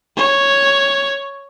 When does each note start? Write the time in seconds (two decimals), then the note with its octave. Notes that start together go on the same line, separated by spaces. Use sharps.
0.17 C#5